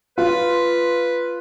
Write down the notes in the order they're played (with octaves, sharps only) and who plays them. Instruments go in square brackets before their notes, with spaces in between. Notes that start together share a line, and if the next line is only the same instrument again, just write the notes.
[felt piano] F4 [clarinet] B4